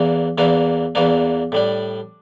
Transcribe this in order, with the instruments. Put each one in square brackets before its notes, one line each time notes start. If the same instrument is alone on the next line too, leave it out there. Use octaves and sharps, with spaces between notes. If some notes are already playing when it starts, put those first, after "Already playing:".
Already playing: [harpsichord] E2 E3 A#3 D4
E2 E3 A#3 D4
E2 E3 A#3 D4
A2 G3 D4